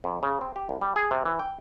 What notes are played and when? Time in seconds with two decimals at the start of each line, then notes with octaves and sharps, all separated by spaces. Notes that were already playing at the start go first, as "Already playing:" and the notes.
0.04 F2
0.23 C#3
0.41 C4
0.56 G4
0.69 C2
0.81 G3
0.96 G#4
1.11 C3
1.25 E3
1.39 G5